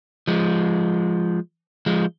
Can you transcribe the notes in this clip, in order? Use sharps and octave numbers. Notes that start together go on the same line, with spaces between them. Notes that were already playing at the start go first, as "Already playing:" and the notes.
F3 G#3
F3 G#3